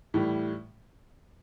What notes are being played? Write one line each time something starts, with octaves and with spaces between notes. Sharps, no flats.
A2 E3 G3